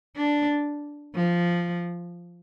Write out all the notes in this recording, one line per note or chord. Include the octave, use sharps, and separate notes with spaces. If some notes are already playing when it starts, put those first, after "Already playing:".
D4
F3